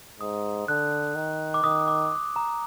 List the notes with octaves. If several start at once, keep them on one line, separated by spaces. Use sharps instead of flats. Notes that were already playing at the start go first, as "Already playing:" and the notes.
G#2 D#6
D3 F#6
D#3
D6
D#3 D#6
D6
A#5